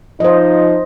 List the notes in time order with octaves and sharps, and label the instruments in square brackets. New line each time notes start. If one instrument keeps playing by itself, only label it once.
[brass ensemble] F3 D#4 [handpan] C5 D#5